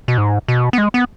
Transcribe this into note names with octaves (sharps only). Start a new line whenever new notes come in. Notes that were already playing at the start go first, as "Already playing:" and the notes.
B2
G#2
B2
B3
G#3
B3